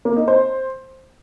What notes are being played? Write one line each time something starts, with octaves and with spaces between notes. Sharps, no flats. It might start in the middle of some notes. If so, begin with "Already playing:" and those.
A#3
D#4
C5